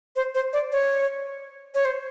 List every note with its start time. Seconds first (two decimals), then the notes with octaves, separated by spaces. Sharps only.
0.16 C5
0.35 C5
0.53 D5
0.72 C#5
1.75 C#5
1.85 C5